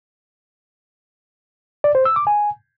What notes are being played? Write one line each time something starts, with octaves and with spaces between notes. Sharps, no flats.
D5
C5
E6
D6
G#5